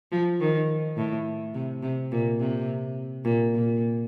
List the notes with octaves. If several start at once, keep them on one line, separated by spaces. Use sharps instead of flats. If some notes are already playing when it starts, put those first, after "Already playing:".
F3
D#3
A2
C3
C3
A#2
C3
A#2
A#2